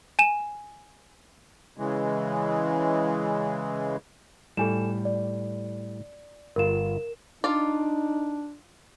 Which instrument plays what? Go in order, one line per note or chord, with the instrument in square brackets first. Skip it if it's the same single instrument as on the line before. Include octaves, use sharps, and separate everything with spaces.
[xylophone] G#5 E7
[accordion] C#3 E3 G#3
[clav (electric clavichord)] A2 G3 [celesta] A4 G#5 E7
[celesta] D5
[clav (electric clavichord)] G1 F4 [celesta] A#4 E7
[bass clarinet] D4 [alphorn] D#4 [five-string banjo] F4 D5